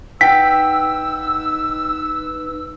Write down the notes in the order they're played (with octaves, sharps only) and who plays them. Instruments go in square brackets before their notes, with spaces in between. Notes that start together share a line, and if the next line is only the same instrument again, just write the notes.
[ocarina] D#4 [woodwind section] B4 E6 [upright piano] F#5 G5 [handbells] B6